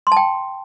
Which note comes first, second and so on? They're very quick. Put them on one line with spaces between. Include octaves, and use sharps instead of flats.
C6 A5 G5